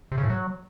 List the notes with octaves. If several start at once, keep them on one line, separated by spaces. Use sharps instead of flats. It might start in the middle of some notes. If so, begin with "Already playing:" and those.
C3
C#3
A2
F#3